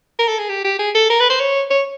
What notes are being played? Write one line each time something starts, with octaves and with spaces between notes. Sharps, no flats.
A#4
A4
G#4
G4
G4
G#4
A4
A#4
B4
C5
C#5
C#5